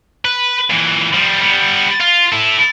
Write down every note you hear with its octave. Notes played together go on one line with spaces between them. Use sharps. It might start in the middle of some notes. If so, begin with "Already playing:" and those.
B4
A#2 E3
F3 G3
G3 B3
F4
E4 A4